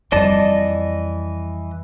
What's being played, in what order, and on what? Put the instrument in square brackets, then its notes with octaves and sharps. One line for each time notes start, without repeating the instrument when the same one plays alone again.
[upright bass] F2 G3 [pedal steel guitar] E3 D#5 A5 [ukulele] D5